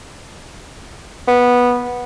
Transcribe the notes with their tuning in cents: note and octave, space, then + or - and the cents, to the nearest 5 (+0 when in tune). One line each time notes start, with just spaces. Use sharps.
B3 -10